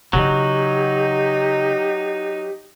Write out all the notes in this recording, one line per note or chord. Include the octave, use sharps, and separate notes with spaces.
C#3 F#3 D4 D#4 G4